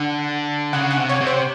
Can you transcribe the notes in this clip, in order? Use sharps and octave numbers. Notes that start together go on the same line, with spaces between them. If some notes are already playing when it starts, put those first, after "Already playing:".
Already playing: D3 F#5
C#3 F#5
F#5
C3
C#5
C3
C5